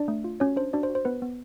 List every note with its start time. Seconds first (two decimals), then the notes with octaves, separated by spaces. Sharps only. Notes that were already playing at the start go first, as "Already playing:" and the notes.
Already playing: D4 D5
0.08 A3
0.24 F4
0.40 C#4 F#4 C#5
0.56 D4 C5
0.73 D4 F#4 D5
0.83 C5
0.89 F#4
0.95 C5
1.05 B3 B4
1.22 B3